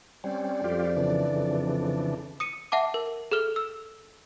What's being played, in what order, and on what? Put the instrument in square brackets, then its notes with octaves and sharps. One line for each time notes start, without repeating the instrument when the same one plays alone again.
[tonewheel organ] G3 C4 C#4 [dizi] D5
[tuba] F2 [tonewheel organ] F4 G4
[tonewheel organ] C#3 E3 D4
[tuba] F2
[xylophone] D#6 C#7 D#7
E5 F#5 A5 D6
A#4
G#4 A4 F6 G7
E6